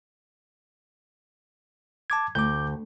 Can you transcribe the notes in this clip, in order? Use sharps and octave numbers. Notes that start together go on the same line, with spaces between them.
A5 D6 G#6
D2 D6 G6